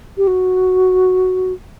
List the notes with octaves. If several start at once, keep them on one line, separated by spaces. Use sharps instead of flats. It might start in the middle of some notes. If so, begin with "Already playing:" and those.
G4
F#4